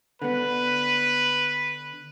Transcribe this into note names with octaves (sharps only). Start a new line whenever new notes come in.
D3 B3 B4